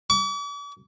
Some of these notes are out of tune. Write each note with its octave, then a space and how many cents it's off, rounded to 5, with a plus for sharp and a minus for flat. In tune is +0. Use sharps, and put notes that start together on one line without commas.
D6 -45